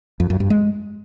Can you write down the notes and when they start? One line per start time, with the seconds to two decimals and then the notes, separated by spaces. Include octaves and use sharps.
0.20 F2
0.30 F#2
0.40 G2
0.50 G#3